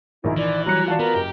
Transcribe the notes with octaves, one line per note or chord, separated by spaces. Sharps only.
A#1 D#3 E4 G#4 A#4
E3 D5
F#3 G3 C#5 A#5 F#6 C#7
F4 F#4 D5 F5 A5
B3 A#4
F#1 G4